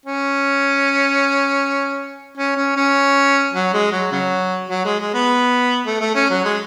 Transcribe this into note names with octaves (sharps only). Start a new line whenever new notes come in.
C#4
C#4
C#4
C#4
F#3
G#3
F#3
C#3 F#3
F#3
G#3
G#3
B3
A3
A3
C#4
F#3
G#3